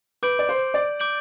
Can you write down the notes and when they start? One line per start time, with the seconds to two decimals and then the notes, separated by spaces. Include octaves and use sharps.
0.23 B4 D6 G6 D7 F#7
0.39 D5
0.49 C5
0.74 D5
1.00 D6 G6 D7 F#7